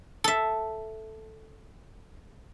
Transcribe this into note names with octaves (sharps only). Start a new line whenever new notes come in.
A4 E5